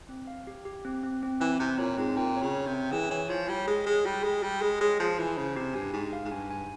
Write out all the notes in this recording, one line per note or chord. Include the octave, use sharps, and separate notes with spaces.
C4
F5
G4
G4
C4
C4
C4
E3 C4
C3 C4
A#2 C#5
G#2 C4
A#2 G5
C#5
C#3
C#5
C3
G5
E3 G#4
E3 C#5
F3 C#5
G3 C#5
G#3 G#4
G#3 C#5
G3 G#4
G#3 G5
G3 G5
G#3 G#4
G#3 C#5
F3 G#4
E3 G#5
C#3 C5
C3 G4
G2 G#5
G#2 G4
F5
G#2
G2 G#5
G#5